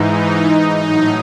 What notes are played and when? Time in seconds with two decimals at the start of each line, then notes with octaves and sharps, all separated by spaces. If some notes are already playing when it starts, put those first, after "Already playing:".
Already playing: G#2 E3 D#4
0.74 A2 F#3 D#4